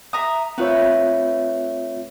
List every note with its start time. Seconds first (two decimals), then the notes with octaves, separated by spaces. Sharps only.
0.13 E5 A#5 D#6
0.58 A3 C4 F4 B4 C#5